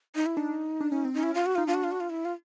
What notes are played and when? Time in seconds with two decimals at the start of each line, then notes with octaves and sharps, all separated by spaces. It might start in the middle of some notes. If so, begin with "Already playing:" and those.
0.15 D#4
0.26 E4
0.37 D4 D#4
0.80 D4
0.92 C#4
1.05 C4
1.14 C#4 D#4
1.23 E4
1.35 F4
1.46 F#4
1.55 D#4 F4
1.67 D4 F4
1.75 F#4
1.84 F4
1.91 F#4
2.00 F4
2.10 E4
2.25 F4